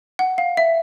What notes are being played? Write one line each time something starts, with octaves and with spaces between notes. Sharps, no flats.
F#5
F5
E5